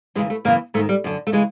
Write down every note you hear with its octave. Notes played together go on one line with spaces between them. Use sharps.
D#2 C#3 E3 G#3
A3
F#2 C#3 E3 A#3
G#2 D#3 A3
G3
F#2 D3
A3
C#3 E3 G#3